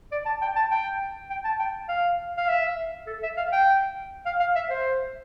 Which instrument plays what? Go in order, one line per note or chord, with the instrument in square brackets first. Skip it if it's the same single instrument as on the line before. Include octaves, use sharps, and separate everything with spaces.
[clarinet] D5
A5
G5
A5
G5
G5
A5
G5
F5
F5
E5
A4
E5
F5
G5
F5
F5
E5
C5